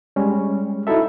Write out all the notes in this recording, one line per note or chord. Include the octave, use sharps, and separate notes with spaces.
G3 G#3 C#4
D#4 E4 F#4 A4 E5